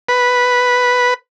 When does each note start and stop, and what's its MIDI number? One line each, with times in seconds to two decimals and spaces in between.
0.09 1.14 71